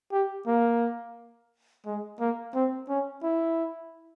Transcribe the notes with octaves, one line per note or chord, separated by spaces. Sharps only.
G4
A#3
G#3
A#3
C4
C#4
E4